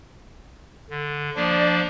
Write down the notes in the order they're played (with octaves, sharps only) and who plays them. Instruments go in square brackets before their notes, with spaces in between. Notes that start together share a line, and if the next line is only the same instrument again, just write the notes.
[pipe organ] D3
[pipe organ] F3 A#3 D4 [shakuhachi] D5